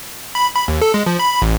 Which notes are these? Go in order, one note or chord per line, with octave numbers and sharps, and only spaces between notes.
B5
B5
D#2
A4
G#3
F3
B5
A1